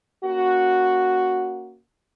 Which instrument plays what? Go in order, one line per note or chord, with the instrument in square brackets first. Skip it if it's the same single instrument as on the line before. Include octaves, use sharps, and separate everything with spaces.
[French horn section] A#3 C#4 F#4